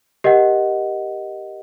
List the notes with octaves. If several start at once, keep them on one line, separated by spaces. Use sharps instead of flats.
G4 A#4 D#5 F#5